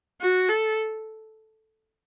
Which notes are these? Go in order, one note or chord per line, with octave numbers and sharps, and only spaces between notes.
F#4
A4